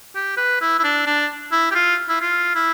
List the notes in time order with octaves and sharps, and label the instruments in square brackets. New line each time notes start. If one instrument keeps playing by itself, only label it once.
[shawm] G4
B4
E4
E4
D4
D4
E4
G4
F4
E4
F4
E4